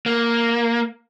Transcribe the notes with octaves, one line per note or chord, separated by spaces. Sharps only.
A#3